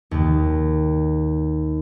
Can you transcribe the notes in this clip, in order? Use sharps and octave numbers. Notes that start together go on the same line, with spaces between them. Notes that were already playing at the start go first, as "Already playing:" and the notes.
D#2 D#3